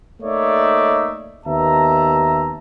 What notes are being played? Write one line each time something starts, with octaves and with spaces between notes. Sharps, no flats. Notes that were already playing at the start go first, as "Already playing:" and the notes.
A3 A#3 D#4 C#5 D5 E5
D#2 B3 E5 A5 A#5